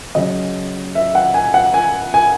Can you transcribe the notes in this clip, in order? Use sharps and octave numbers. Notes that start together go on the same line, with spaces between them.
C#3 F#3 D#5
E5
F#5
G#5
F#5
G#5
G#5